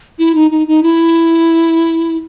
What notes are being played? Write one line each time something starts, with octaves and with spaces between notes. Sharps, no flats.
E4
D#4
D#4
D#4
E4